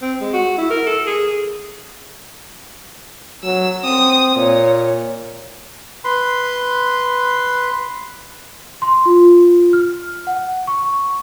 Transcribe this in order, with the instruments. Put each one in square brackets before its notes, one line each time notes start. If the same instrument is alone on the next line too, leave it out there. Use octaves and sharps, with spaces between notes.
[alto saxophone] C4
G#3
F#4
E4
A#4
A4
G#4
[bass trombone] F#3 [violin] E6
[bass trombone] C4 [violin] D#6
[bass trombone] A#2 [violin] C#5
[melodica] B4 C6
[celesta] C6
F4
F6
F#5
C#6